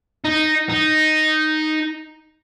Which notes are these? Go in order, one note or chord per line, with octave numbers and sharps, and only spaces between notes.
D#4
D#4